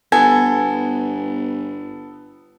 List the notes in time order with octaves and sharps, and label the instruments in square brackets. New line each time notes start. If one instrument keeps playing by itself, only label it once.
[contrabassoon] G1 [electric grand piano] B3 A4 [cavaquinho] G#5